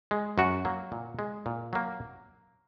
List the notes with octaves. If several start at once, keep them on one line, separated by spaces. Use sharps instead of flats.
G#3
F#2 F#4
F#3 A#3
A#2
G#3
A#2
F#3 A#3